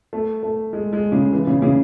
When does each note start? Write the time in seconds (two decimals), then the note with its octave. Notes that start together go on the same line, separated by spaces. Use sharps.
0.13 A3
0.43 A3
0.73 G#3
0.93 G#3
1.12 C#3
1.32 E3
1.47 C#3
1.62 C#3